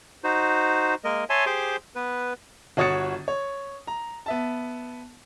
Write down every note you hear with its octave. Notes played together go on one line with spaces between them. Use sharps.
D#4 F#4 C5
G#3 A#3 A#4 D#5
C#5 E5 G#5 A5 C6
G4 G#4 C5 C6 D6
B3 B4
G1 F#4 C#5 D#6 A6 C#7
C#5
A#5
B3 E5 A5